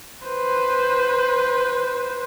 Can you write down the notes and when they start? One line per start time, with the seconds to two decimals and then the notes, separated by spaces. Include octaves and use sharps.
0.25 B4 C5